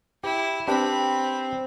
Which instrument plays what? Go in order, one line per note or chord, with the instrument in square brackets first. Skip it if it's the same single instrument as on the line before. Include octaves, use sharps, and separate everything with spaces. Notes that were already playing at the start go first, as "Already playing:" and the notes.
[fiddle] E4 [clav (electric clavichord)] G4
[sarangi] C4 [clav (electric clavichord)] D4 G4 B4 [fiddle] B5